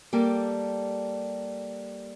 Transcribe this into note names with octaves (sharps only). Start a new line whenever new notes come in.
G3 A#3 G4 A4